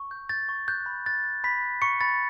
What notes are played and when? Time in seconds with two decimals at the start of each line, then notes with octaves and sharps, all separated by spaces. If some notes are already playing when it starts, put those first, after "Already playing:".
Already playing: C#6
0.11 G6
0.29 G6 A6
0.49 C#6
0.68 F#6 G6
0.86 B5
1.06 F#6 A6
1.24 F#6
1.44 B5 B6
1.62 F#6
1.82 B5 C#6 C#7
2.01 B5 A6